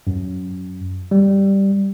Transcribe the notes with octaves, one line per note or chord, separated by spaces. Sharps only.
F#2
G3